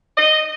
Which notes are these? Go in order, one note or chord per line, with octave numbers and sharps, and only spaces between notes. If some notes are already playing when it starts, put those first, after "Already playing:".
D#5